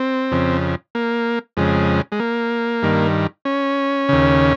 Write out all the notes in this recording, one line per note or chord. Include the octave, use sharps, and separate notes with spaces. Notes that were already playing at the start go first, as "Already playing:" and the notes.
Already playing: C4
F2 C#3
A#3
F2 C#3 G#3
G#3
A#3
G2 D#3
C#4
D#2 C#3